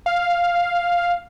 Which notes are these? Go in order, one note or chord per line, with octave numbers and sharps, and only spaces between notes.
F5